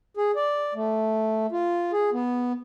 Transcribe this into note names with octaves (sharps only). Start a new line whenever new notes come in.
G#4
D5
A3
F4
G#4
B3